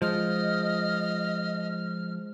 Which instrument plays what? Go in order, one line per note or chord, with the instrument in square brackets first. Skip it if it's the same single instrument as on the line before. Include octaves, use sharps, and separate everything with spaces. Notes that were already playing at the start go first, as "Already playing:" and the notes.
[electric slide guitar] F3 [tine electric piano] G#3 C5 [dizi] D#5 [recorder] F6